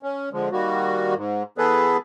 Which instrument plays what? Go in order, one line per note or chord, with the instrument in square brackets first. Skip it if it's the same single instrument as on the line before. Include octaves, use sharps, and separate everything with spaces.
[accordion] C#4
D3 F3 G#3
D#3 G3 A#3 F#4
G#2
E3 B3 G#4 A4 B4